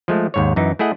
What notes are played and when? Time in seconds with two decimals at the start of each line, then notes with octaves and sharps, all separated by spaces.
0.08 F3 G#3 A3
0.34 D#2 G#2 C#5
0.56 F#2 E3 D#4
0.79 A3 E4 G#4 D#5 F#5